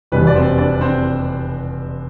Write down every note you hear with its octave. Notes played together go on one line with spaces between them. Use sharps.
F1 E2 B2 G3 B3 B4
D5
C4 C5
D4 D5
C4 C5